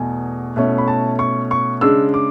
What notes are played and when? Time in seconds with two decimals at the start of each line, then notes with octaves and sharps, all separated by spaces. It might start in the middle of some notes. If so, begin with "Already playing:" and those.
Already playing: E2 B2 A3 G#5
0.56 B2 A3 C#4 E4
0.78 B5
0.88 A5
1.19 C#6
1.51 C#6
1.81 C#3 G#3 D4 E6
2.14 D6